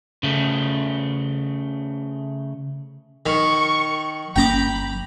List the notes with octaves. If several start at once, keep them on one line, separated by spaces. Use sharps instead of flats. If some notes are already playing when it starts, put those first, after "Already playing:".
C#3 A3
D#3 C#6
G1 A#3 C#4 G5 A#5 B5 D6